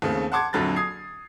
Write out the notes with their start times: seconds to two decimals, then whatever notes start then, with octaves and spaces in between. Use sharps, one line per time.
0.02 D#2 C#3 A3 C4
0.32 F#5 A5 C6 D6 G#6
0.53 A#1 F2 D3 F#3 B5 A6
0.76 D#6 G#6 C7